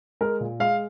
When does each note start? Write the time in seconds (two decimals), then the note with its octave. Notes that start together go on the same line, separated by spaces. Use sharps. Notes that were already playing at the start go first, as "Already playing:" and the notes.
0.21 G#3 A#4
0.40 A#2
0.60 G#3 F5